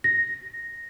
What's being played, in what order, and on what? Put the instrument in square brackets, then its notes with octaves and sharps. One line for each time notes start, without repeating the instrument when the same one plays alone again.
[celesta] A#6